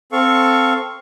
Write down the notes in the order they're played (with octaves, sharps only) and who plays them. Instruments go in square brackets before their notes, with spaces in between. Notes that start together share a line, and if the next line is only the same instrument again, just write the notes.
[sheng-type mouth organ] C4 A4 F5 C#6